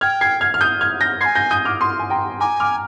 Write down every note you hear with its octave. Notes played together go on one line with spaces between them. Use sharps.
G5 F6 G#6
G#6 C7
F6 G#6
F6
D#6 G6
F6 G#6
G6 A#6
G#5 C6 G#6 C7
G6 A#6
D#6 G6
D6 F6
C6 D#6
G#5
G5 A#5
G#5 A#5 D6
D6 F6